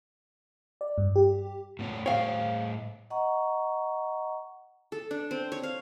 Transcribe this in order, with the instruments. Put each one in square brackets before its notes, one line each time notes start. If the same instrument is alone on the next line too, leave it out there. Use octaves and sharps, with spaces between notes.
[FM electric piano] D5
G2
G4
[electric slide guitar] A2 B3 C#5
[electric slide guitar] A2 C5 G5 [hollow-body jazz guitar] C#5 F5
[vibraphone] D#5 F#5 A#5 C#6
[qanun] A4
D4
C4
C#5
F5